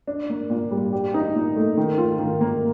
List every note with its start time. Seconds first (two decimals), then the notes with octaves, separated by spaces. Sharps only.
0.07 D4
0.30 A#3
0.50 A#2
0.71 G3
0.93 G4
1.14 D#4
1.35 A#2
1.56 A3
1.77 D#3
1.98 F4
2.19 D#3
2.41 A#3